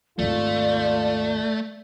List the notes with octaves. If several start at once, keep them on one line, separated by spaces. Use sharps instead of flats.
G#1 D#2 A3 F4 D5